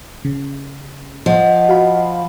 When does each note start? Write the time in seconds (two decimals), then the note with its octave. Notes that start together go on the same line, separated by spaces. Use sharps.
0.25 C#3
1.26 F3 D#5 F#5
1.69 F#4 F5 B5